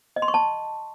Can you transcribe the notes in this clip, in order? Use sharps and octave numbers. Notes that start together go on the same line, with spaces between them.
D#5
C6
C#6
A5